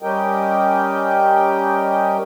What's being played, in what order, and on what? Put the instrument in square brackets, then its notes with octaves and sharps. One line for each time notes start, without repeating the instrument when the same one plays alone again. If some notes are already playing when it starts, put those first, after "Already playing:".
[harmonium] G3 C#4 G4 A#4 D#5 G5